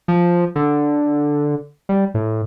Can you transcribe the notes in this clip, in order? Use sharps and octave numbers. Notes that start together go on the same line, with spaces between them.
F3
D3
G3
A2